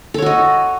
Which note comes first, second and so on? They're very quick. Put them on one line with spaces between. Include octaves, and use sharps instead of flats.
A4 C#5 F#4 D#5